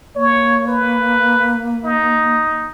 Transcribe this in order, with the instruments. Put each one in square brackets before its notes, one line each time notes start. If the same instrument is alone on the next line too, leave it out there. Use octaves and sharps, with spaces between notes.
[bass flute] A#3 [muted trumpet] C#5
[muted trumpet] B4
D#4